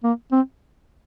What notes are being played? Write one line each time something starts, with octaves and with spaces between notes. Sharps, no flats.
A#3
C4